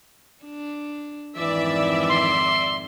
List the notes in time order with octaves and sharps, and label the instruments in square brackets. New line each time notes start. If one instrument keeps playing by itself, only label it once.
[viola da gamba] D4
[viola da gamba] F2 G#2 D#3 [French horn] E3 [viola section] D5 E5
[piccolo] C6